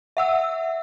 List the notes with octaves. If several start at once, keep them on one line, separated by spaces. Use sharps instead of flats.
E5 F#5 E6